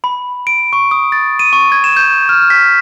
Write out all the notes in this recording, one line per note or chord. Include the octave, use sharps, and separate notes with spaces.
B5
D7
C#6
D#6
A6
D#7
C#6
G#6
E7
G6
F6
B6